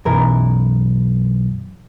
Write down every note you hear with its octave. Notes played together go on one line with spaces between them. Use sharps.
B1 F#2 E3 A#4